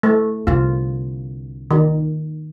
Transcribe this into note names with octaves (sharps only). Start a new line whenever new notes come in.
A3
C2 D3 F4
D#3